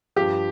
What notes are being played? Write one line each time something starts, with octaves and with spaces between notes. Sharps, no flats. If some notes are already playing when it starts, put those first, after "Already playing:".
G2 F3 G4